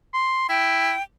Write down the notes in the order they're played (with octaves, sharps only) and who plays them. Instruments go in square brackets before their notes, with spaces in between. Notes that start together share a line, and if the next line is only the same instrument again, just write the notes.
[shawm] C6
[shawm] E4 [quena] G5